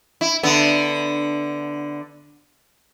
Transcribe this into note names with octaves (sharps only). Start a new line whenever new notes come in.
E4
D3 B3